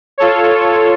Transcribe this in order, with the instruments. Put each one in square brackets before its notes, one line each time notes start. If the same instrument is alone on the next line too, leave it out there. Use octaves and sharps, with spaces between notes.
[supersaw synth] F4 A4 C#5